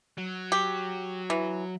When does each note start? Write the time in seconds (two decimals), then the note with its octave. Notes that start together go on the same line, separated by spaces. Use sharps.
0.18 F#3
0.52 G4
1.30 E3